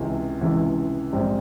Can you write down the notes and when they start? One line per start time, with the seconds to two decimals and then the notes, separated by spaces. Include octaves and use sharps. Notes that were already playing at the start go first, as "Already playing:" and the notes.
Already playing: C#2 C3 E3 G#3
0.41 C#2 C3 E3 G#3
1.13 A#1 G#2 G3 C4